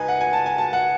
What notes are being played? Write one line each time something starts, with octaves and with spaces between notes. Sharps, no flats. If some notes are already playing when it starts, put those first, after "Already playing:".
Already playing: C#2 D#4 B4 G#5
F#5
G#5
A5
G#5
A5
F#5